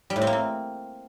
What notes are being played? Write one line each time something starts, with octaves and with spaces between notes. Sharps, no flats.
G3
A2
C4
A#3
C4